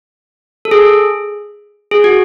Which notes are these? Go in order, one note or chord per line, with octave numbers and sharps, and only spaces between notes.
A4
G#4
G#4
F#4